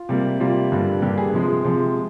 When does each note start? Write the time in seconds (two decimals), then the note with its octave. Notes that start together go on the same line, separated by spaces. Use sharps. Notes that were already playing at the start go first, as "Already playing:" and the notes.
Already playing: F4
0.09 C3 G3 A#3
0.40 C3 G3 A#3 F4
0.72 G2 D3 G3 A#3
1.02 G2 D3 G3 A#3 G4
1.18 G#4
1.34 C3 F3 G#3 G#4
1.64 C3 F3 G#3